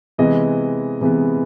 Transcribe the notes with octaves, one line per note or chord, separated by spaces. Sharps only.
C3 E3 G#3 B3 D#5
C3 E3 G#3 B3